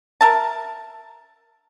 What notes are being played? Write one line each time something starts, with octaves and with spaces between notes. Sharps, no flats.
A#4 E5 A5